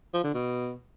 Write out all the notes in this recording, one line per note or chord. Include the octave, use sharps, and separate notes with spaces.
F3
D3
B2